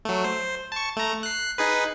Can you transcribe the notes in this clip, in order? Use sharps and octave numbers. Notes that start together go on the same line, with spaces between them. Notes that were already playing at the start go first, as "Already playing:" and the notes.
F#3 A3
C5
A5 C#6
A3 A#5
F#6 C7
D#4 G#4 B4